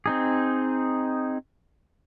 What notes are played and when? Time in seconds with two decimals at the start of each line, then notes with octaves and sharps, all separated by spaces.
0.06 C4 D#4 G#4